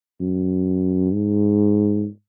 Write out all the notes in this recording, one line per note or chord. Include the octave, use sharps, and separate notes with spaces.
F#2
G#2